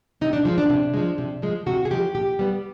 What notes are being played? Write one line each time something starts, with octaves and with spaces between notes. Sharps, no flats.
C3 D#4
D4
F3 G#3
D4
C3
F3 G#3
C3
F3 G#3
C3 F#4
G#4
F3 G#3 G4
A#2 G4
G3 B3